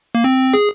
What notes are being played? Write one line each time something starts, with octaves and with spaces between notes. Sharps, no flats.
A#3
C4
G#4